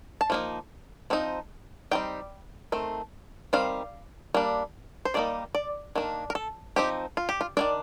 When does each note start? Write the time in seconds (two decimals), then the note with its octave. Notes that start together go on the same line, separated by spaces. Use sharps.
0.21 A5
0.30 F3 A#3 D#4
1.10 F3 C4 D#4
1.91 G3 C4 D#4 G5
2.72 D#3 A3 C4
3.53 D#3 G3 C4 F5
4.34 G3 A#3 D4
5.05 C5
5.14 D#3 G3 A#3 D#4 D5
5.55 D5
5.96 D#3 A#3 D4
6.30 A#4
6.35 A4
6.76 F3 C4 D#4 G4
7.17 F4
7.29 G4
7.41 F4
7.57 D#3 A#3 D4 D5